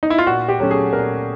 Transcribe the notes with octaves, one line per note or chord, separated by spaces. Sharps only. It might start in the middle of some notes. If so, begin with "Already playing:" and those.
D#4
E4
F4
A#2 F#4
G4
F#3 A3 C#4
G#4
A#2 A#4